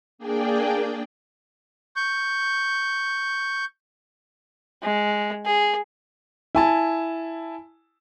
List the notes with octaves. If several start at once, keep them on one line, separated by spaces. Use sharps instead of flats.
A#3 D4 G#4 D5 G5
C#6 G6
G#3
G#4
E4 G#5 A5